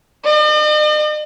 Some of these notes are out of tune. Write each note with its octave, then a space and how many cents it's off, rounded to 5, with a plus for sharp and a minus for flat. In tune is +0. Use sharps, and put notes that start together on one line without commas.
D#5 -45